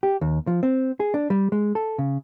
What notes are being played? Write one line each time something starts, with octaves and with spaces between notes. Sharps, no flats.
G4
D#2
F3
C4
G#4
D4
G3
G#3
A4
C#3